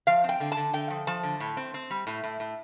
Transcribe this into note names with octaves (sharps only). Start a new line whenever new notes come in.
F3 F5
C4
G5
D3
A5
D3
D3 G5
F3
F3 A5
D3
A2
C4
C4
G3
A2
A2
A2